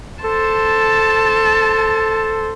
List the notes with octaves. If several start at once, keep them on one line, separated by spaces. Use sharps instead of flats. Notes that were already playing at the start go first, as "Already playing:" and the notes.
A4 C5 A5